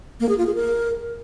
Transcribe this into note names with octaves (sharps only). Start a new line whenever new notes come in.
A#3
G#4
F4
G#4
A#4